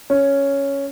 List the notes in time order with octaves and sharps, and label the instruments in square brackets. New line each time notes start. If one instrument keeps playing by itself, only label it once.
[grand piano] C#4